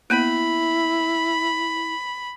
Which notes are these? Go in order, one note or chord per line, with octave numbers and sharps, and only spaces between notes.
A#3 B3 E4 B5